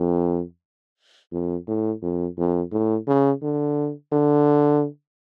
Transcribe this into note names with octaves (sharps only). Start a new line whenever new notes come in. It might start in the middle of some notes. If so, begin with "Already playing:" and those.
Already playing: F2
F2
A2
F2
F2
A2
C#3
D3
D3